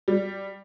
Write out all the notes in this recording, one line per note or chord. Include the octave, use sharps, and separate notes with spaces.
G3